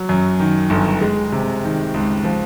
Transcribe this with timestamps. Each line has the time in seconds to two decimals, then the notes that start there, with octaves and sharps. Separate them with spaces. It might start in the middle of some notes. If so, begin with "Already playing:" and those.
Already playing: F#3
0.09 F#2
0.40 D#3
0.70 G1
1.01 G#3
1.32 C3
1.64 D#3
1.94 C#2
2.24 F3